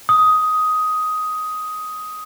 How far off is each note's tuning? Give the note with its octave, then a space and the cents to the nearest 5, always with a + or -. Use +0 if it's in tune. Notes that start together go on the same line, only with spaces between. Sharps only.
D#6 +10